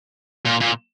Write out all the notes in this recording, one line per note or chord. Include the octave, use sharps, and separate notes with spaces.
A#2
A#2